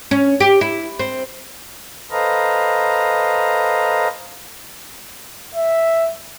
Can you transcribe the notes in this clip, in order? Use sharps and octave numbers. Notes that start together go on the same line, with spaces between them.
C#4
G4
E4
C4
A4 B4 C5 D#5 F5 A#5
E5